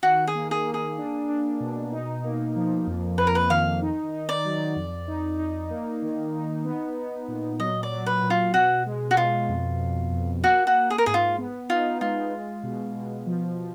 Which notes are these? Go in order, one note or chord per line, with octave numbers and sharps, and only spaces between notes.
D#3 F#4
G#4
A#3
G#4
A#3
G#4
D4
D4
B2
D#4
A#3
F3
F2
F2 B4
A#4
B4
D#3 F5
D#4
D#4
D5
F#3
F2
D#4
D#4
A#3
D#3
D#4
B3
B3
A#2
F#3 D#5
D5
F#3
B4
A#2
F4
B2 F#4
G#3
F#4
B2 F4
F2
F2
F2
A#3 F#4
F#4
A#3
G#4
A#4
G#2 G#4
F4
B3
D#4 F4
G#3 F4
G#3
B2
B2
F3
F3